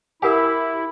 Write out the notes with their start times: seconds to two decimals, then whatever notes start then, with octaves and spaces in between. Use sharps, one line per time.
0.22 E4 G4 A#4 E5 F#5 G#5